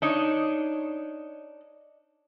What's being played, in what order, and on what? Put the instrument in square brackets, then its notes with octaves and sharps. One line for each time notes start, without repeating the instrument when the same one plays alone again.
[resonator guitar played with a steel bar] D4 D#4 C#5